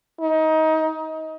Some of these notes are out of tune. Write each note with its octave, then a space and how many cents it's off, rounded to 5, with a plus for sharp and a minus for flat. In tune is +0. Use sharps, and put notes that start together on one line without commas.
D#4 +25